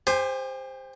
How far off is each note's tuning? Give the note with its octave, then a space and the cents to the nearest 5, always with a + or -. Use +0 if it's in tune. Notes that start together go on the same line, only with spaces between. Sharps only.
G4 +35 C5 +0 G#5 +0